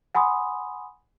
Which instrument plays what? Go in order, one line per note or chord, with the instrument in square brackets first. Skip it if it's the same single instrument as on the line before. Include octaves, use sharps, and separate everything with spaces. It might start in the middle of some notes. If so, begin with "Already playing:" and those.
[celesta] F#5 G#5 B5 C6 D#6